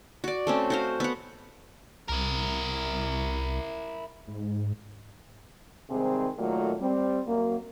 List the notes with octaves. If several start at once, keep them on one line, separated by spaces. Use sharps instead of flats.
F#4 D5
A3 C4 C#4
F#4 C5 F5
B3 F#5
C2 E4 A#4
G#2
G#2 C3 D#3 G3 C4 G#4
A#2 D#3 F#3 A3
G3 C4
F#2 A#3